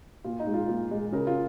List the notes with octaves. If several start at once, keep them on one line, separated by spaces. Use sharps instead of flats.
A#2 F4
D#4
G#3
F4
A#2
G#3
C#3 A#4
F4